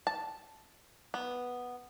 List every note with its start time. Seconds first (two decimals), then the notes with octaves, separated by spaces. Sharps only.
0.07 A5
1.14 B3